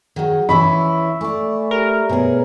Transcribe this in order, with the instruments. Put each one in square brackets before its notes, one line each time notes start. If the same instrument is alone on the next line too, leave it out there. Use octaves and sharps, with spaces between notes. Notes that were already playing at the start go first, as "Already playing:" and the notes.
[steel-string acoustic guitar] D#3 F#3 [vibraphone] G#4 F#5
[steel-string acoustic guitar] E3 C#4 E4 [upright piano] B5 [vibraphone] C#6 E6
[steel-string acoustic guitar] A3 D5 [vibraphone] G#5 C#6
[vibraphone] G4 E5 [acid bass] A#4
[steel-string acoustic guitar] B2 G#4 [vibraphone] B4 C#5 G#5